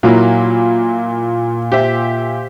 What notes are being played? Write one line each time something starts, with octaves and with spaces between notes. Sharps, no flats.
A#2 F#3 A#3 E4
G4 C5 E5